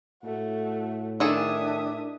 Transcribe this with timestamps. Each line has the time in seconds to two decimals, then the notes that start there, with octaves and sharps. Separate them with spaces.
0.24 A2 A3 F#4
1.20 D#3 D4 G#4 A4 E5 D#6